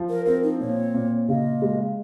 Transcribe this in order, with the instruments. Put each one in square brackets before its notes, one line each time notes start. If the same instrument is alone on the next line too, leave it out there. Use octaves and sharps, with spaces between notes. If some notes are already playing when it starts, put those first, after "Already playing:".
Already playing: [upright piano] F3
[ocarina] A#4
[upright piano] C4 [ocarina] A#4
[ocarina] D#4
[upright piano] A#2 [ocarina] C#5
[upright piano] A#2
[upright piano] C#3 [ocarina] D#5
[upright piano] G#3